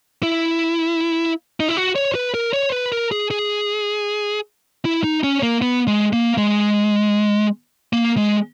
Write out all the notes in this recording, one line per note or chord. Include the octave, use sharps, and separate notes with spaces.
E4
D#4
E4
F#4
C#5
B4
A#4
C#5
B4
A#4
G#4
G#4
E4
D#4
C#4
A#3
B3
G#3
A#3
G#3
A#3
G#3